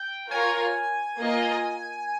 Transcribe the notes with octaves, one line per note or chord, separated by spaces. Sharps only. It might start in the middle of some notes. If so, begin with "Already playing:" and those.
Already playing: G5
F4 A#4 C#5 G#5
A#3 F4 A#4 D#5